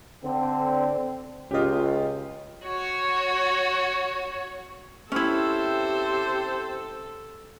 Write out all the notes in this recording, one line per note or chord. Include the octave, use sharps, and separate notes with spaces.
D3 C4
C#2 C#4 F4 G4 D#5
F#4 C#5
C4 C#4 E4 G4 A4 C5